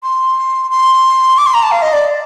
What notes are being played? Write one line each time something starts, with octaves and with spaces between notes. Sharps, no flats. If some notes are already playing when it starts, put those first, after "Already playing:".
C6
C6
D6
C6
A#5
A5
F5
D#5
D5